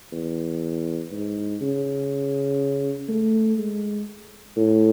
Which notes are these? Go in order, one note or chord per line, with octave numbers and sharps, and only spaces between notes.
E2
G#2
C#3
A3
G#3
A2